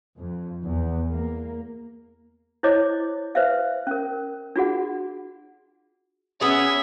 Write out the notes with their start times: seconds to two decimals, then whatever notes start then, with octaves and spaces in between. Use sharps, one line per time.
0.18 F2
0.66 E2
1.10 A#3
2.63 E4 C5 C#5 D#5 D6
3.35 B4 C5 E5 F5
3.87 C#4 A#4
4.56 D4 F4 F#4 G#4 F#5
6.41 B3 C#4 G#4 E5